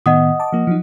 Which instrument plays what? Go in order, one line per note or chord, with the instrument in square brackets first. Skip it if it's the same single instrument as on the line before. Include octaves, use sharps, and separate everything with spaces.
[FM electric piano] A2 D#3 B3 [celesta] D#5 F#5 D#6
[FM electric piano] A5 D6
F3 A#3
F3 F#3 D#4